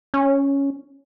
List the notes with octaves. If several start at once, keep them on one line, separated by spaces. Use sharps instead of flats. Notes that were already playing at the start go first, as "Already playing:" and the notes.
C#4